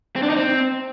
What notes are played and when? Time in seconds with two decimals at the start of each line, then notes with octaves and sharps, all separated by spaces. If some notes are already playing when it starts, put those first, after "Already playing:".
0.16 C4
0.23 D4
0.30 D#4
0.36 C4